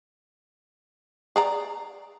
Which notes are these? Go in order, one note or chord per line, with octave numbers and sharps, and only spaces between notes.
G#4 D5 A#5